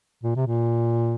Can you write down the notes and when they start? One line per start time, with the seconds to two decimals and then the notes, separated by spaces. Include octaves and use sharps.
0.23 A#2
0.36 C3
0.47 A#2